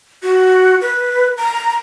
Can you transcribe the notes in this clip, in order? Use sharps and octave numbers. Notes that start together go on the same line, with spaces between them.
F#4
B4
A#5